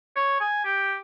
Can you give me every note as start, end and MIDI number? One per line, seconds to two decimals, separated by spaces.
0.16 0.38 73
0.40 0.63 80
0.65 0.97 67